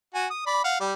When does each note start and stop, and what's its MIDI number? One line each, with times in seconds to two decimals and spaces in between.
0.14 0.27 66
0.14 0.27 80
0.30 0.42 87
0.46 0.59 74
0.46 0.59 83
0.64 0.77 77
0.64 0.77 78
0.80 0.94 55
0.80 0.94 74